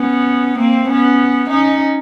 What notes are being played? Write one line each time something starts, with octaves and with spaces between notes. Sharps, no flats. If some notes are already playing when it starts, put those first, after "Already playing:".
Already playing: B3 C#4
A#3 C4
B3 C#4
C#4 D#4